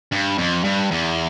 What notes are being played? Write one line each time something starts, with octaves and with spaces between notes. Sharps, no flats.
G2
F2
G2
E2